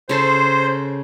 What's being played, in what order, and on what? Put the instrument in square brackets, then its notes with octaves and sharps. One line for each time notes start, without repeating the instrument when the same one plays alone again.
[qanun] C#3 A4 [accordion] C5